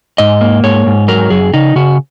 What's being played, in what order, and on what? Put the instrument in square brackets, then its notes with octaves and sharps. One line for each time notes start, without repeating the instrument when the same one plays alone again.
[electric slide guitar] G#2 D#5
A#3
G#2 C#5
G#2
F#3 A#4
F#2 G#4
C#3 D#4
C#3 F#4